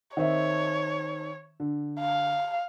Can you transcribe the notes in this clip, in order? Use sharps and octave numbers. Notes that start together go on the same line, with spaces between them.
D#3 C4 C#5 E5
D3
F5